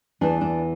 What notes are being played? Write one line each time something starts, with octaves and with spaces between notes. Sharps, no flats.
E2 E3 D4
D4